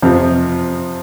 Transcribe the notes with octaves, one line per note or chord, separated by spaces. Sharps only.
F2 C3 F3 C4